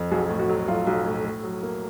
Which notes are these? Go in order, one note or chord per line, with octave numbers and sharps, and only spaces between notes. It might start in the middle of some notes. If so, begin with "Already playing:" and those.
Already playing: F2
B1 F#4 G#4
A2
F#4
F#3
B1 F4
B1
A2
A2
F#3
A#3